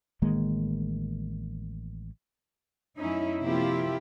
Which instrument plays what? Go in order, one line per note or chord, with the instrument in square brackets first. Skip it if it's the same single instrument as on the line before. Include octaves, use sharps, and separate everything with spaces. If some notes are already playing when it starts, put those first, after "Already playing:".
[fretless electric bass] A1 D#3 G#3 A#3
[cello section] F#2 A3 C#4 D#4 E4
C3 F3 A#3 E4 F4 G4